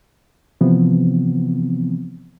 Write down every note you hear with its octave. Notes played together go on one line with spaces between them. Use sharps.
C3 E3 F3 B3 C4